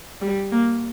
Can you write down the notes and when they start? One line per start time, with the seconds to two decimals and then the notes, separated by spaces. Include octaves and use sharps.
0.21 G3
0.52 A#3